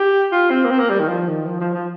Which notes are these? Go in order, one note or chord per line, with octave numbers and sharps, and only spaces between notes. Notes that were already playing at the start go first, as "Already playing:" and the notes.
Already playing: G4
F4
C4
A#3
C4
A#3
G3
D#3
F3
D#3
F3
F3
F3